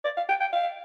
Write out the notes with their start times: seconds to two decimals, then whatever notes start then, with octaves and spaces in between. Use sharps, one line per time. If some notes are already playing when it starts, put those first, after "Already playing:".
0.05 D5
0.17 F5
0.29 G5
0.40 G5
0.53 F5